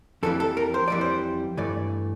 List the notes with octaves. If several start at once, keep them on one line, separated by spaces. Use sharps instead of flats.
F2 E3 G3 A4
A4
A#4
C5
F2 E3 G3 D5
C5
G2 E3 A3 D5